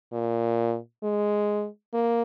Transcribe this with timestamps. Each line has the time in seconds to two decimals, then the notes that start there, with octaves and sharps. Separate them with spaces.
0.13 A#2
1.03 G#3
1.94 A#3